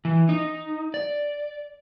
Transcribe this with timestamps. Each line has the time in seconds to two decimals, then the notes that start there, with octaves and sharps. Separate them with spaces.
0.05 E3
0.29 D#4
0.94 D5